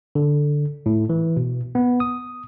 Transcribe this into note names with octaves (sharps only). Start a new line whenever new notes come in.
D3
A2
E3
B2
B3
D#6